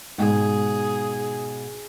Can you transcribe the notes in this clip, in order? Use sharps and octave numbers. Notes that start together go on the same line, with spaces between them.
G#2 B2 G#4